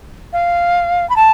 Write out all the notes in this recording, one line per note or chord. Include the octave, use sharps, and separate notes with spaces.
F5
B5
A5